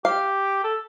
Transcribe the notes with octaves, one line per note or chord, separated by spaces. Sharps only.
G4 F5
A4